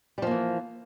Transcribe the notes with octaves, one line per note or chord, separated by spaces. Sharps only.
E3 F3 G3 A#3